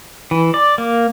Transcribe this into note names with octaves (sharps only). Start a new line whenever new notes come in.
E3
D5
A#3